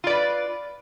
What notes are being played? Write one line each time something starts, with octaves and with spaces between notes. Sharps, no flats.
F4 B4 D5